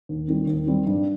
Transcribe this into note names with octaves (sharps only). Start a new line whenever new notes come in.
D#2
D#3 G3 C4
D#2
D#3 G3 C4
G2